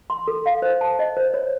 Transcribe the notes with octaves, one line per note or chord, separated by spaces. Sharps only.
C6
A4
F5
C5
A5
D#5
C5
C#5